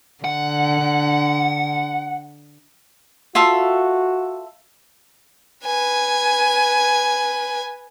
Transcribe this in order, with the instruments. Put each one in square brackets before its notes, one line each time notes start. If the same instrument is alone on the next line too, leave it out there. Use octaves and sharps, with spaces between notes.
[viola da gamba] D3 [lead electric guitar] F#5
[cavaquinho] F4 A4 E5 [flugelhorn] F#4
[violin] B4 G#5